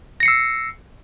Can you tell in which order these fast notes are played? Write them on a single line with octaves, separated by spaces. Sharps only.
A#6 C#7 C7 E6